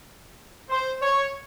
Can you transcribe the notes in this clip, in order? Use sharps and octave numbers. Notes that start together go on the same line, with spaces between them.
C5
C#5